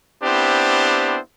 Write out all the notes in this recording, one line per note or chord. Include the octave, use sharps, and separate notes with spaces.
B3 C4 D4 E4 G4 C5